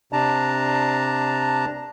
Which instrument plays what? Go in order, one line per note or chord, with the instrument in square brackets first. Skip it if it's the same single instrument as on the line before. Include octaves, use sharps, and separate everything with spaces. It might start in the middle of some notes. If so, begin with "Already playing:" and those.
[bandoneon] C3 D4 A5 A#5